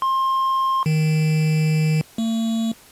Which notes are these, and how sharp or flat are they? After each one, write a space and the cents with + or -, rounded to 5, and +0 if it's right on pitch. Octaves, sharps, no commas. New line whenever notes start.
C6 +25
D#3 +5
A3 +45